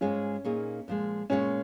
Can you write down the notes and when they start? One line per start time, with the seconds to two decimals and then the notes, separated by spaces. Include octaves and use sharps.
0.01 G#2 G#3 C#4 F4 G#4
0.44 A#2 A#3 D#4 G#4 C#5
0.88 A#2 F3 G#3
1.30 A#2 G#3 C#4 F4 A#4 C#5